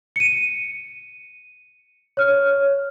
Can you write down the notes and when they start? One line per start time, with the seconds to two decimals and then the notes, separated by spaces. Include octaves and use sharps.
0.16 C#7 D#7
2.17 C#5 F6